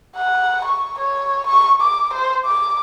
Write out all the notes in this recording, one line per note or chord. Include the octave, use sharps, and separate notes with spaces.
F#5
C#6
C#5
C#6
D6
C5
D6